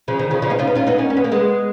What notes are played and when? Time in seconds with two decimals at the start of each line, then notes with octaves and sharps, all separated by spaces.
0.08 C#3 F3
0.19 D#3
0.31 C#3 F3
0.42 C#3 F3
0.50 B3 D#4
0.59 C#4 F4
0.67 B3 D#4
0.75 C#4 F4
0.87 B3 D#4
0.98 A#3 C#4
1.10 C#4
1.17 B3
1.24 A#3
1.32 G#3 B3